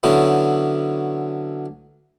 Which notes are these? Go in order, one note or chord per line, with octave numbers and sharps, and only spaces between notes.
D3 F#3 B3 C#4 E4